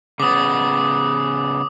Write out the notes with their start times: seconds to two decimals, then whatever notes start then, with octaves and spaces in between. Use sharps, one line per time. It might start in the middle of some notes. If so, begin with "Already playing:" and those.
0.20 C#3 B3 D6 D#6